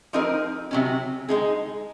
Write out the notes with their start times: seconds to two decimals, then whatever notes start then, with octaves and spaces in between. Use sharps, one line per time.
0.13 F3 C4 D#4 A#4
0.71 C3 F#3 C#4
1.29 G#3 D#4 G#4